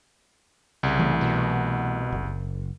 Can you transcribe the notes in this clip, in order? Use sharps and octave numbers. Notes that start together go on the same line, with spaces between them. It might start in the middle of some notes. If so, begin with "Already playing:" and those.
C2 C#3
E3 A3
B2
F#1